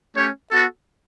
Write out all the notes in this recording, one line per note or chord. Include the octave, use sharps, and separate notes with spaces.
A3 C#4 G4 C#5
B3 F#4 A4